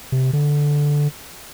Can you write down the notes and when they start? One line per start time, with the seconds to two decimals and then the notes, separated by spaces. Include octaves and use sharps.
0.12 C3
0.33 D3